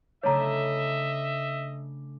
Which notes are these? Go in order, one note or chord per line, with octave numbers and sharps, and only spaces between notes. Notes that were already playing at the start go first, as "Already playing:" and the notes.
C#3 A3 D4 C#5 D#5 E5 A#5